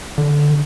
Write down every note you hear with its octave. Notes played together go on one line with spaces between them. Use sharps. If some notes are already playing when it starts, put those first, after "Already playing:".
D3